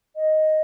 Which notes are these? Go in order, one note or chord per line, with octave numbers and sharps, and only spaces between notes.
D#5